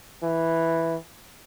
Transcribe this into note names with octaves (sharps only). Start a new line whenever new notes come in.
E3